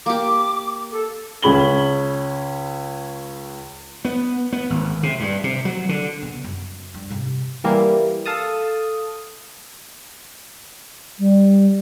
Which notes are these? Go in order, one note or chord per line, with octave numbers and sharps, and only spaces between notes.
A#3 G4 D6
A4
C#2 C#4 G#4 B5 F#7 G7
B3
B3
G#1
C3
G2
C3
F#3
D3
C#3 B3
F#2
G2
G#2 C3
E3 G3 A#3 E4
A4 F5 A5 D#6
G3